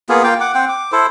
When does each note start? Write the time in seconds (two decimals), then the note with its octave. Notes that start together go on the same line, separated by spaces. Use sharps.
0.09 A#3 B3 F4 G#4
0.23 A#3 F4 F5 G5
0.40 F#5 D6
0.54 C4 C5 F#5 G5
0.69 D6
0.92 E4 A4 C5